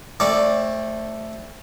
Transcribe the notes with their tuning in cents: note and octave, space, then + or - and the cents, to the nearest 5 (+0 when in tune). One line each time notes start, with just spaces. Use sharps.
A3 +0 C4 +35 D5 +0